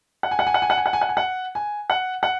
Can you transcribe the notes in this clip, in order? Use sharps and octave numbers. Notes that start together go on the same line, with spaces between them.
F#5
G#5
F#5
G#5
F#5
G#5
F#5
G#5
F#5
G#5
F#5
G#5
F#5
G#5
F#5
F#5